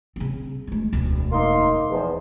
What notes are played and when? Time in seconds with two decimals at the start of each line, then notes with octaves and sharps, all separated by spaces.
0.16 C#3 C4
0.67 G#3 A3
0.93 E1 D2
1.32 A#3 D#4 C6
1.90 E2 F3